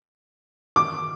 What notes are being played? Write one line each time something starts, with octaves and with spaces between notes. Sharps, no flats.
D6